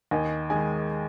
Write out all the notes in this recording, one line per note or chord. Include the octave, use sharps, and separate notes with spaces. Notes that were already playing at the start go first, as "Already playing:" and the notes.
D#2 D#5 G#5
D#3 G#3 D#5 G#5